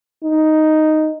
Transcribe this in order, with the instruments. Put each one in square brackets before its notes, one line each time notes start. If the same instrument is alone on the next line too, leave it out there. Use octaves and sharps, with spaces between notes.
[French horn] D#4